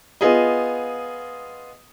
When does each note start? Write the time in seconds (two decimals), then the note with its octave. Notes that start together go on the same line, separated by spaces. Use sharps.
0.21 B3 F4 G#4 D#5